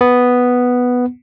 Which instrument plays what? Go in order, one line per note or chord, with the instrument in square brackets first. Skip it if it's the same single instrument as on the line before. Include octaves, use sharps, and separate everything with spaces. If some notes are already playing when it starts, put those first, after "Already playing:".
[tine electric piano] B3